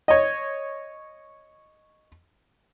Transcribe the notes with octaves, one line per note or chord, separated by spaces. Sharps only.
C#5 D#5